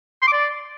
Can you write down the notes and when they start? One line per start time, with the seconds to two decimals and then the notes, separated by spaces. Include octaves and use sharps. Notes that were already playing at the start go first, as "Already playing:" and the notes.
0.22 C6
0.28 D6
0.33 D5